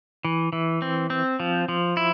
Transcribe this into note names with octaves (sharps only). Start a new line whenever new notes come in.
E3
E3
C4
C4
F3
F3
E4